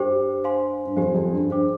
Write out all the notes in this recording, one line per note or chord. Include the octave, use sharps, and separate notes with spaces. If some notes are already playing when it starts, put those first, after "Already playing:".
Already playing: G2 G4 C5 G5 D6
C5 F5 G#5 C6
G2
F2 G4 C5 F5 G#5
F2
G2
G2 D4 G#4 C5 G5 D6